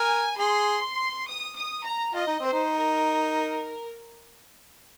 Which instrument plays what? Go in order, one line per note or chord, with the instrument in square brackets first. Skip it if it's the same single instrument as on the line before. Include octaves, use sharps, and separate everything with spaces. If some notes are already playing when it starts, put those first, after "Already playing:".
Already playing: [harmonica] A#4 [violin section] G#5
[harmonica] G#4 [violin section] C6
[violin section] D#6
D#6
A#5
[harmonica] F4 [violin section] D#5
[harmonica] D#4
[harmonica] C4 [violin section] C5
[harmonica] D#4
[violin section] A#4